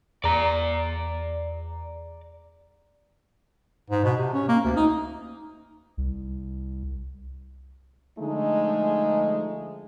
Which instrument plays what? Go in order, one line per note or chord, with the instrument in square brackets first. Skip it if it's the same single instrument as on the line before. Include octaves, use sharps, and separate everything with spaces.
[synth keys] E2 [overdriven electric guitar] D5 A#5
[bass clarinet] G#2
B2
C3
C#4
A#3
D2
D#4
[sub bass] C2
[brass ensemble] D3 F3 G#3 A3 D#4